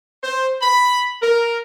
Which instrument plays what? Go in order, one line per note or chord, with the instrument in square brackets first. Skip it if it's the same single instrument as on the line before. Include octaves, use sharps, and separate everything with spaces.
[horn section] C5
B5
A#4